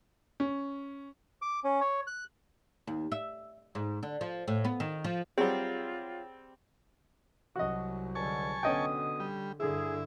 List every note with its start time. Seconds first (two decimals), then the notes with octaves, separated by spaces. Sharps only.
0.40 C#4
1.42 D6
1.64 C#4
1.81 C#5
2.07 F#6
2.87 D#2
3.12 E5
3.75 G#2
4.03 D3
4.21 F3
4.48 A2
4.65 B3
4.80 D#3
5.04 F3
5.38 F#3 G3 C4 F4 G#4
7.56 C2 F#3 F#4 D#5
8.15 C#2 D3 G3 G#5 A5 C#6
8.63 B2 D3 B3 C#4 D#5 G5 D#6
9.20 G3
9.60 G2 D3 E4 G#4